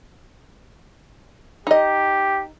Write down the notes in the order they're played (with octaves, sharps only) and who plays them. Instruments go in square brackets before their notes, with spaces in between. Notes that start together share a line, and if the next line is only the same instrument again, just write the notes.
[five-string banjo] D#4 D#5 [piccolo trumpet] G4